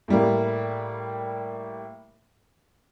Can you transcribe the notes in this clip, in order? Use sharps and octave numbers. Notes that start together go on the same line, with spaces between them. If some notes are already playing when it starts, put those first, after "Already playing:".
A2 G3 A#3